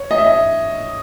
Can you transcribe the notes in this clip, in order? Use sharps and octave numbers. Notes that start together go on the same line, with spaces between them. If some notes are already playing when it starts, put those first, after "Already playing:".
Already playing: C#5
D#5
E5
D#5